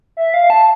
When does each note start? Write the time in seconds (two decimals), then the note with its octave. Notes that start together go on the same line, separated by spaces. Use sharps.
0.17 E5
0.34 F5
0.50 A5